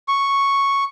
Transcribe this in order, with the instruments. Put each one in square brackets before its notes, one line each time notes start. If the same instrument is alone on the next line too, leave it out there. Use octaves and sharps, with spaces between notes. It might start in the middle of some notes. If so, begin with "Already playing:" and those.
[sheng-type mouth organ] C#6